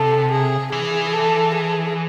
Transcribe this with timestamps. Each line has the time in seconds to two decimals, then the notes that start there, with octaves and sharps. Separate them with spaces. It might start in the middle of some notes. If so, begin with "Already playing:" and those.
Already playing: C3 A4
0.31 G#4
0.72 E3 G#4
1.13 A4
1.55 G#4